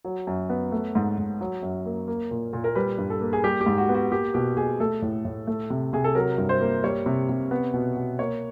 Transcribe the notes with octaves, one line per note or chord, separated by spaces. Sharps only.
F#3
F#2
B3
A3
G#2
G#2
F#3
F#2
A#3
A#3
A#2
A#2
A#4
G3 B4
G2
A4
A#3
G#4
G3 G4
G4
G#2
F#4
B3
F#4
A#3 G4
B2 G4
B2 G#4
A3 A4
A2
A2
A3
C3
C3 G#4
A4
F#3 A#4
G2
C5
A#3
G3 C#5
C3
C3
B3
B2
B2
A#3 C#5